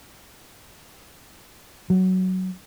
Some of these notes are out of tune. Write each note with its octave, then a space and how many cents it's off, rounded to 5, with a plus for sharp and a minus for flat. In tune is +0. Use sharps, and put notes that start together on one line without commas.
F#3 +10